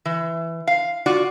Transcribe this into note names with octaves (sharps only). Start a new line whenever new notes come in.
E3
F5
F4 F#4 D5 F#5